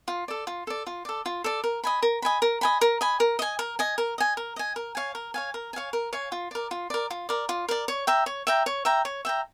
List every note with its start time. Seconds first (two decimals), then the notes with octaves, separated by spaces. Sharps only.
0.08 F4
0.28 A4 D5
0.47 F4
0.67 A4 D5
0.87 F4
1.05 A4 D5
1.26 F4
1.44 A4 D5
1.64 A#4
1.84 D#5 G#5 B5
2.03 A#4
2.22 D#5 G#5 B5
2.42 A#4
2.61 D#5 G#5 B5
2.81 A#4
3.01 D#5 G#5 B5
3.20 A#4
3.39 D#5 G#5
3.59 A#4
3.79 D#5 G#5
3.98 A#4
4.18 D#5 G#5
4.37 A#4
4.56 D#5 G#5
4.76 A#4
4.95 C#5 F5 G#5
5.15 A#4
5.34 C#5 F5 G#5
5.54 A#4
5.73 C#5 F5 G#5
5.93 A#4
6.13 C#5 F5 G#5
6.32 F4
6.51 A#4 D5
6.71 F4
6.90 A#4 D5
7.10 F4
7.29 A#4 D5
7.49 F4
7.69 A#4 D5
7.88 C#5
8.07 E5 G5 A#5
8.26 C#5
8.47 E5 G5 A#5
8.66 C#5
8.85 E5 G5 A#5
9.05 C#5
9.25 E5 G5 A#5